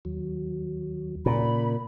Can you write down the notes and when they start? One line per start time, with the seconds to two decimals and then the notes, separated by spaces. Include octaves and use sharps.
0.05 D#2 F#3
1.26 A#2 C#3 B5